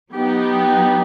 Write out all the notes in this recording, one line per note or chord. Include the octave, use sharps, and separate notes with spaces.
F#3 B3 D#4 G4